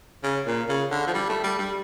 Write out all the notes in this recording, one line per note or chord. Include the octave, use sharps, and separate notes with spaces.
C#3
A#2
C#3
D3
F3
G3
A3
G3
G3